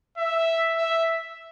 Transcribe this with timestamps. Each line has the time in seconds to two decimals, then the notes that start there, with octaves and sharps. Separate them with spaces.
0.18 E5
0.77 E5